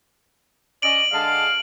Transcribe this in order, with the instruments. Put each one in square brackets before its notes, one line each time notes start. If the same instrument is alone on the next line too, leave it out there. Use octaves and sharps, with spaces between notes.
[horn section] C#4 D5 D#5 [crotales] D7 F#7
[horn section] D3 G#3 A5 [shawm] F5